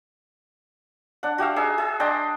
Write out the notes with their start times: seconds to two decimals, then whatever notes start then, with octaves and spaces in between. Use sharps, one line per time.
1.23 D4 F#5
1.38 F#4 G4 E5 F5
1.56 D#4 G#4 E5
1.78 G#4 E5
2.00 D4 C5 D#5 G5